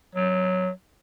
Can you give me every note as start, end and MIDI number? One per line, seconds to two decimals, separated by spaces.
0.15 0.70 54